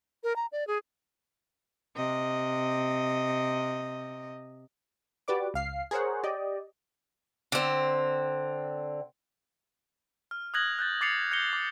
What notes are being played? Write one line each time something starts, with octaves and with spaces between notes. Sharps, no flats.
A#4
A#5
D5
G#4
C3 D#5
F#4 G4 B4 D5 D6
C#2 F5 C7
G#4 A#4 C5 C#5 F#5
G4 D5 D#5
D3 C4
F6
D#6 F6 F#6 G#6 A#6 F#7
F#6 G6 A6
D6 A6 C7 C#7 F7
G6 A#6 C#7 G7
D6